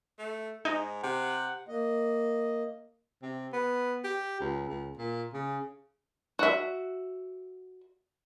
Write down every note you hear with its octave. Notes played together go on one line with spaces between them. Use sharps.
A3
G#2 D#4
C3 F#5
A#3 D#5
C3
B3
G4
C#2
C#2
A#2
C#3
F#4 E5